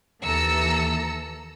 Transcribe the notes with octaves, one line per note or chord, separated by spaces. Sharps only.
D#2 E3 A4 A#5 E6 C#7